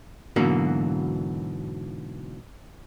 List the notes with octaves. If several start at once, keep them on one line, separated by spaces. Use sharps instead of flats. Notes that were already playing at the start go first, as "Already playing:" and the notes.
G#2 B2 D3 E3 F#3 A#3